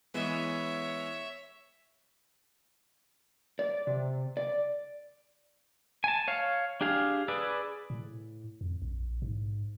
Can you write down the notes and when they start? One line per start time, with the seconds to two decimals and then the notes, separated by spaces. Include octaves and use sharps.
0.14 E3 G#3 B3 C#5 E5
3.59 D5
3.87 C3
4.37 D5
6.04 G#5 A5
6.28 C#5 F5
6.81 D4 G4 G#4 F5
7.28 G#4 B4 D5 E6
7.90 A2
8.61 F2
8.82 A#1
9.22 G#2